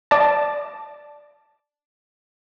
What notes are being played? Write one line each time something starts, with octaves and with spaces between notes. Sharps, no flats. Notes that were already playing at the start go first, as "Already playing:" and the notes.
D5 A5